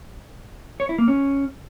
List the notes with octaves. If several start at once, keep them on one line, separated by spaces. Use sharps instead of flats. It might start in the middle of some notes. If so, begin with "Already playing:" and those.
C#5
E4
A#3
C#4